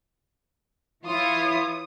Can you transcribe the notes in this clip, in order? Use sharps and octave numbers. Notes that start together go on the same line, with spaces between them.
E3 E4 F4 C#5 D#6